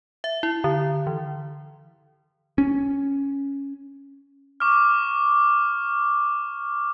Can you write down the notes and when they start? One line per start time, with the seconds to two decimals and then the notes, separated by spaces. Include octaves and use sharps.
0.24 E5
0.43 E4
0.64 D3
1.07 E3
2.58 C#4
4.60 C#6 D6 F6